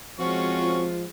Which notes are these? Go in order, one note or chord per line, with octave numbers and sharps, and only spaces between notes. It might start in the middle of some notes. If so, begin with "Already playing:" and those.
F3 G#3 C4 C#4 F4 F#4 C#6